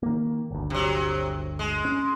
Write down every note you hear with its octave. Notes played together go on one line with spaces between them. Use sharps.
D#3 A#3
G1 D2
C3 F#3
G#3
C#4